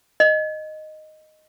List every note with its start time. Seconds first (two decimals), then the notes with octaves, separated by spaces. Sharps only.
0.20 D#5